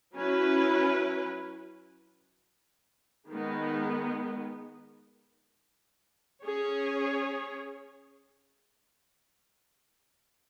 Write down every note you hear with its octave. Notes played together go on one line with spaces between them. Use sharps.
F#3 C#4 E4 B4
D#3 G#3 B3
C#4 G#4 C#5